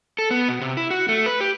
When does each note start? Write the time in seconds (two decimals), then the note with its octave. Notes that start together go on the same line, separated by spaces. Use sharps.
0.19 A4
0.31 B3
0.48 B2
0.61 C3
0.77 E4
0.90 F#4
1.09 A3
1.26 B4
1.41 G4